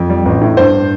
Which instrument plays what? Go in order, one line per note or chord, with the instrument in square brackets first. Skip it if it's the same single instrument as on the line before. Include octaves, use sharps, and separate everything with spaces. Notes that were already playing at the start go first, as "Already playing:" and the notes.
Already playing: [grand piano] F2
G3
A1
A2
G2 C5